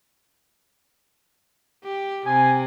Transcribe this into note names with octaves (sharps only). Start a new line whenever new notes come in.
G4
C3 G#5